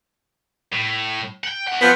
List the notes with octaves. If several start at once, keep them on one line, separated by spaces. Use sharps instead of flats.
A2
F#5 G5
A3 F#5
F3 B3 C4